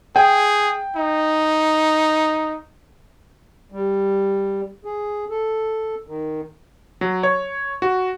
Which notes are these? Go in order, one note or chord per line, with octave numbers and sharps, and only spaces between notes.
G#4 G5
D#4
G3
G#4
A4
D#3
F#3
C#5
F#4